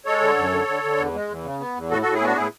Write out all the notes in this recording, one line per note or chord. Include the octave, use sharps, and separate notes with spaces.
G#3 A4 C#5
D3
F#2
D3
D3
D3
E2
G#3
E2
C#3
B3
E2
A2 F#4 A4
A2 F#4 A4
E4 G#4
B3 D4 F#4
A2 E4 G#4